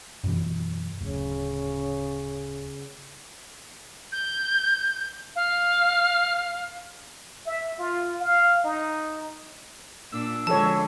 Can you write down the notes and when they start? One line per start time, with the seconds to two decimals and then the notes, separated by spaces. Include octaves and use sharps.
0.24 F#2 B2 E3
1.01 D1 C#3
4.12 G6
5.35 F5
7.46 E5
7.79 F4
8.20 F5
8.64 D#4
10.12 A#2 D4 E6
10.47 D3 F3 G#3 A4 C#5 A5